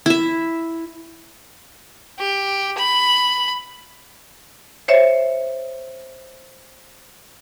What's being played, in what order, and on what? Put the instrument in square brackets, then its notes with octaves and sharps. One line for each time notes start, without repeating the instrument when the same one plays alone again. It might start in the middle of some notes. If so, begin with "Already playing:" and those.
[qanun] E4 E5
[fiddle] G4
B5
[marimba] C5 C#5 E5